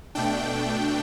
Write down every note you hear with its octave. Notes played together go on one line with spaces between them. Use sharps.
B2 A3 D4 G5